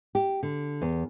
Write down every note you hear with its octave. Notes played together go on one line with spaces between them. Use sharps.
G4
D3
E2